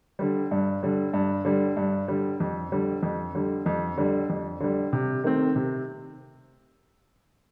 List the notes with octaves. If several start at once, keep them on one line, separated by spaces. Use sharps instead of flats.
D3 G3
G2
D3 G3
G2
D3 G3
G2
D3 G3
F2
D3 G3
F2
D3 G3
F2
D3 G3
F2
D3 G3
C3
D#3 A3 C4
C3